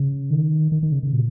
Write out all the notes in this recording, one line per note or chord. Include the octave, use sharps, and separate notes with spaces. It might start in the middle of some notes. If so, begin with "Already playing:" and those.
Already playing: C#3
D#3
D#3
D#3
C#3
C#3
A#2